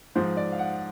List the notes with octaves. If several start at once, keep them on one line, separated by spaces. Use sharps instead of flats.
G#2 F3 C5
D5
F5
F#5